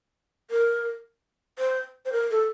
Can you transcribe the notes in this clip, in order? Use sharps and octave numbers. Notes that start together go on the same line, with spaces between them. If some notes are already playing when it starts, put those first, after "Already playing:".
A#4
C5
C5
A#4
A4